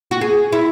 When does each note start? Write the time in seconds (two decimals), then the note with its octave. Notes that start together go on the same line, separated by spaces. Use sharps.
0.11 F#4
0.21 G#4
0.52 E4